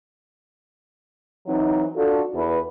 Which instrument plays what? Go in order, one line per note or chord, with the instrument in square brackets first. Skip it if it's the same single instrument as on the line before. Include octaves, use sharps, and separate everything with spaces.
[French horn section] E3 F#3 C4 D#4
D4 F4 F#4 A4
E2 B4